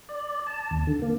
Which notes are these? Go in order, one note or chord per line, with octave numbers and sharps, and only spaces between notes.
D5
A5
D#2
D3
A#3